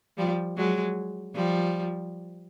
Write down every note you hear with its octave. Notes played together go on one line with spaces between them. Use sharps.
F3 G3
F#3 G#3
F3 G3